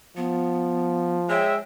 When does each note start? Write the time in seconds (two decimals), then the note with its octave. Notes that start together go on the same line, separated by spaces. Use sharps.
0.17 F3 B3
1.30 G#3 C#5 E5 G5